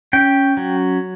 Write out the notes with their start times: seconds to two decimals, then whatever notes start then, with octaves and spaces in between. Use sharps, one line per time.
0.13 C#4 G5
0.57 F#3